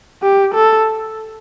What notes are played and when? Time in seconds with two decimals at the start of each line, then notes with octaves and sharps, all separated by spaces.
0.22 G4
0.54 A4